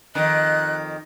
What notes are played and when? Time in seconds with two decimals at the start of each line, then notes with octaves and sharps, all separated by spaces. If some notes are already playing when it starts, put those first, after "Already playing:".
0.15 F2 D#3 D#5 F#6